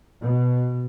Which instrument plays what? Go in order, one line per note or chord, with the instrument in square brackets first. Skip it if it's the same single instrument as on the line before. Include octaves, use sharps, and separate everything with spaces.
[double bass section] B2